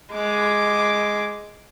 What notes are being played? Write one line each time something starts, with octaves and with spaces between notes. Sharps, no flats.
G#3 D6